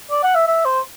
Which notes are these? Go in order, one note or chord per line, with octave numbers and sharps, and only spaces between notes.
D5
F#5
E5
E5
C5